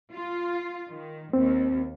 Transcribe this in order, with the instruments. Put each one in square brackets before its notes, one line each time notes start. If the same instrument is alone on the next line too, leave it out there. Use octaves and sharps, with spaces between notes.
[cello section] F4
D#3
[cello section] D#2 [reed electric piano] C4